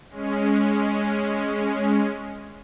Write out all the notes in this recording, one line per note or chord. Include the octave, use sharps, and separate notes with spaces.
G#3 C#4